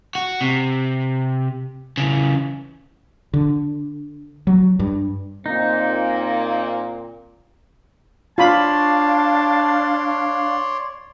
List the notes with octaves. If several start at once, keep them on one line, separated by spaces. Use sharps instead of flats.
F#4
C3
C#3 E3
D3
F#3
G2
A#2 A#3 C4 D#4
D4 F4 C#5 D5 F5 A5 B5 C6